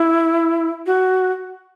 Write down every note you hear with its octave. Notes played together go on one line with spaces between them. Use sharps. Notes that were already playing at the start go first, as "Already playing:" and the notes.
Already playing: E4
F#4